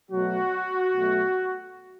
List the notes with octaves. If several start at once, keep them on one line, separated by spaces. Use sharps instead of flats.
B2 F#3 A3 F#4
B2 F#3 A3